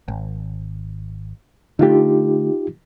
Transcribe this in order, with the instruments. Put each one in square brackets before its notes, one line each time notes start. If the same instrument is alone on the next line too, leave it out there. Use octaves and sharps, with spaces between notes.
[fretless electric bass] G#1
[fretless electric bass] D3 A3 [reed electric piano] D#4 F4 G4